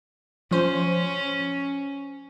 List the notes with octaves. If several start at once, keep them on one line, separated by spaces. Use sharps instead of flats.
F3 C#4 C5